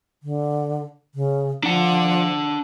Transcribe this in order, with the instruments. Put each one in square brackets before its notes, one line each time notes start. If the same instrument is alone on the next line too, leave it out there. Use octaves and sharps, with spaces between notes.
[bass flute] D3
C#3
[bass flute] F3 [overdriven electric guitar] D4 F#5